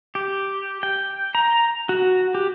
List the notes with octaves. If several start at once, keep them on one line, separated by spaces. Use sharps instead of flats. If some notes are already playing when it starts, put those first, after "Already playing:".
G4
G5
A#5
F#4
G4